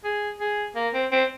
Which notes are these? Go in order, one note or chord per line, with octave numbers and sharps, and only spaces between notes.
G#4
G#4
A#3
C4
C4